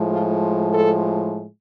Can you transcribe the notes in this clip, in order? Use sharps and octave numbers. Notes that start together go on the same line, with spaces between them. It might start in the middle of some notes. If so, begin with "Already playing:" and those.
Already playing: A2 F3 G#3
F4
A4